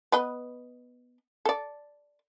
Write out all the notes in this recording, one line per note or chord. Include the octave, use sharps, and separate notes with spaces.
B3 B4 D#5
A4 D5